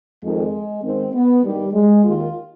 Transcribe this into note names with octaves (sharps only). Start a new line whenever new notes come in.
F2 D#3 G#3
G#2 D#3 C4
B3
G2 D#3 G3
G#3
D#2 D#3 F4